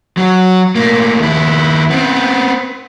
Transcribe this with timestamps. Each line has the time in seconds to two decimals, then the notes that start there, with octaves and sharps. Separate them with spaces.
0.17 F#3 F#4
0.75 A2 A#3
1.20 D#2 E4
1.90 B3 C4